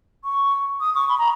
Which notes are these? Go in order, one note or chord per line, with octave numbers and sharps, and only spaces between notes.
C#6
D#6
C#6
B5
A#5